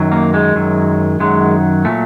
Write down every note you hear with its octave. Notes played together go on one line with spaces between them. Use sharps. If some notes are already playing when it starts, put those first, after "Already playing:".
Already playing: F#2 D#3 F#3
A#3
G#3
F#2 D#3 F#3
F#2 D#3 F#3 G#3
A#2 F#3 A3